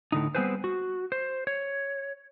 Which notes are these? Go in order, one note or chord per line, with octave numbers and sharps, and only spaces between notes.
A2 D3 D#4
G3 B3 C4 G#4 B4 C5
F#4
C5
C#5